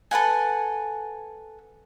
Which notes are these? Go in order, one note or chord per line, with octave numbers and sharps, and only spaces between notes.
A4 B4 F#5 G#5